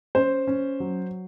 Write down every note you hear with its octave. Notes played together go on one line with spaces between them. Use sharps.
C#4 C5
C#4
F#3